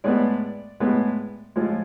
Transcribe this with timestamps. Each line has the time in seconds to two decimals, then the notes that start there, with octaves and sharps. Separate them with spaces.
0.04 A2 G#3 B3 D5
0.80 A2 G#3 B3
1.56 A2 F3 G#3